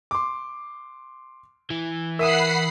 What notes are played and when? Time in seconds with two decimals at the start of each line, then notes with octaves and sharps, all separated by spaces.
0.11 C6 D6
1.71 E3
2.19 A#4 E5 F#5 B5 D#6 C7 D#7 E7